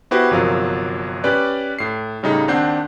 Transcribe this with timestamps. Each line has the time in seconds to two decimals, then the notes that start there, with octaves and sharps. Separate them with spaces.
0.11 B3 E4 F#4 G4 B4 C5
0.31 G1 C3 F3 F#3 A#4 F5
1.24 C#4 G4 B4 D5
1.79 A2 C7
2.23 A2 C#3 G3 D#4
2.48 D#2 C4 D4 F#5 G6 C7